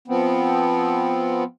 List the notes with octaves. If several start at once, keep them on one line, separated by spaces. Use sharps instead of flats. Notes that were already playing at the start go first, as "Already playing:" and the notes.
F3 B3 C4